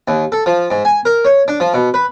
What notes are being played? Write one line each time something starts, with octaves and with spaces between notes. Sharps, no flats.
D#2
A4
F3
G#2
G#5
A#4
C#5
D4
F3
B2
B4